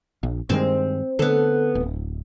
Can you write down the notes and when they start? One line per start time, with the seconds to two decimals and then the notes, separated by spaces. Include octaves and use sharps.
0.23 A#1
0.49 G2 D#3 G#3 C4
1.19 D3 B3 A4
1.75 D1